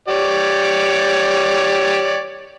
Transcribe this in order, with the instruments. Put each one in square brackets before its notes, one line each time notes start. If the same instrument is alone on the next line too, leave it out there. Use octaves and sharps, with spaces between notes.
[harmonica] G4 C#5 D5